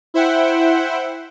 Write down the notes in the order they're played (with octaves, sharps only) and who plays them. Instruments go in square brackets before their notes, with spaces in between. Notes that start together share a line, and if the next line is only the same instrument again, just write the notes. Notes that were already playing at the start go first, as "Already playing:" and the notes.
[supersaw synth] E4 C5 E5 F#5 G5